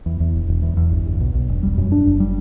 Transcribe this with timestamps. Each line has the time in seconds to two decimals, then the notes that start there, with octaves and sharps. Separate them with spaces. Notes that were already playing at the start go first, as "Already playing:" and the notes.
0.06 E2
0.20 E2
0.35 E1
0.48 E1
0.63 E2
0.77 E2
0.91 G1
1.06 G1
1.20 B1
1.34 B1
1.49 E1
1.63 G3
1.78 F#2
1.92 D4
2.06 F#1
2.20 G3